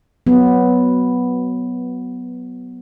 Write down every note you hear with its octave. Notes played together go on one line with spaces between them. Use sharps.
F#3 B3